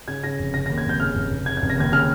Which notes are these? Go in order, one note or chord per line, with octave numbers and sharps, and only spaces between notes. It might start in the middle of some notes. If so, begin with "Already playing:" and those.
C#3 G#6
C#3 A#6
F1
C#3 A#6
D#2 A#6
G#6
F1 G6
C#3 F6
F1
F1
C#3 G#6
F1 G#6
A#6
D#2 G#6
C#3 F6